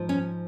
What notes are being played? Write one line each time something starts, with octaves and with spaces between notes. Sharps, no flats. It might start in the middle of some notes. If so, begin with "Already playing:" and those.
Already playing: G#2 F3
C#4